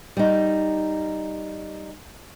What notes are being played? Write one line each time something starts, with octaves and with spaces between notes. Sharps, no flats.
G3 D#4